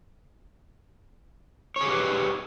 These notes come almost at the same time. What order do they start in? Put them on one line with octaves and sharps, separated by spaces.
C#5 G#4 G4 B4